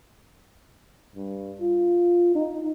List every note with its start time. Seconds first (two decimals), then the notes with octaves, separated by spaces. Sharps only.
1.16 G2
1.60 F4
2.35 D#4